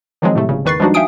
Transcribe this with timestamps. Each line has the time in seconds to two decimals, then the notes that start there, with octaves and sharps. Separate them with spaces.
0.22 D#3 F3 F#3 G#3 C4
0.35 A2 C3 A3
0.49 G1 C#3
0.65 E2 D#3 B4 C#6 A6 C7
0.80 F3 G3 G#3 D4 D#4 F#4
0.94 E5 F5 G5 G#5 D#6 D7